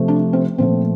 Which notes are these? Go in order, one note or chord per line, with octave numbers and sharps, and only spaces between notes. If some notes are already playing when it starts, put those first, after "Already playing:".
Already playing: C3 F3 A3
D4
C4
A#2 F3 A3 C4